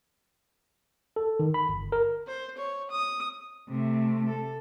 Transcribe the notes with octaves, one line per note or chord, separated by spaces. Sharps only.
A4
D#3
B5
G1
A#4
C5
C#5
D#6
C3 A3
A4